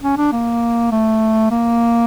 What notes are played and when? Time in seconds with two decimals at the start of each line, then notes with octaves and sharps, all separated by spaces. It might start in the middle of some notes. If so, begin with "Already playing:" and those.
0.03 C#4
0.17 D4
0.32 A#3
0.92 A3
1.51 A#3